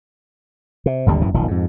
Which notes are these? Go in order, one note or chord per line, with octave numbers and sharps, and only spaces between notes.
C3
G#1 D#2 D3 G3
G#1 F#2 E3
D#1 B1 D#3 F3
F2 G#2